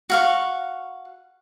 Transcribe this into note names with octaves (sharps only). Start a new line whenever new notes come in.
F#4 F5 C#6